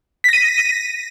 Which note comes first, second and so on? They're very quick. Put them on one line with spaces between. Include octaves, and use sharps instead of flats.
B6 A#6 D#7